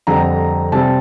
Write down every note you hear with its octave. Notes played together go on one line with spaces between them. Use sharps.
F2 D3 G3 C4 A#5
C3 G3 C4 A5